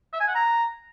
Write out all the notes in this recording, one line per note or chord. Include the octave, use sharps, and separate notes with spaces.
E5
G#5
F#5
A#5